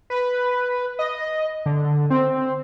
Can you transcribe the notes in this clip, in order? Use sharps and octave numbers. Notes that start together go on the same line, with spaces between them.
B4
D#5
D3
C4